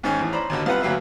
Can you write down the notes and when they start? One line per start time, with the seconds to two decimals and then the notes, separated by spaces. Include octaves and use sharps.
0.04 G#2 D#3 C#4
0.19 E2 A2
0.32 C5 D5 A#5 B5
0.49 D#2 B2 D3
0.66 C2 B3 F4 B4 F#5 B5
0.81 D2 F#3 A#3 B4 E5